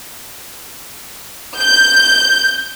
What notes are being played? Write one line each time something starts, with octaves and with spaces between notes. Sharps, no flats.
G6